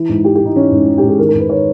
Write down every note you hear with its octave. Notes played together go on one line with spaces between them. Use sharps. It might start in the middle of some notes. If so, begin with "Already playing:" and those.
Already playing: E3
G#2
E3 G4
G#2 G4
D#4
E3 C#4
G#2
E3 D#4
G#2 G4
G#4
D#3 A#4
A#4
G#2
B4
D#3 C#5